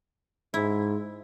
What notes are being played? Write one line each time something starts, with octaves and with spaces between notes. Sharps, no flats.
G#2 E4